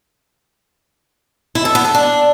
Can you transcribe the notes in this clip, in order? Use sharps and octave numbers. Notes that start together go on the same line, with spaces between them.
E4
A4
B3
A4
D4